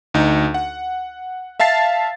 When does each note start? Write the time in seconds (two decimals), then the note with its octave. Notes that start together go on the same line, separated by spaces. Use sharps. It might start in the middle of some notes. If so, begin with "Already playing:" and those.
0.14 D2 D#4
0.54 F#5
1.60 E5 F5 A5 A6 C7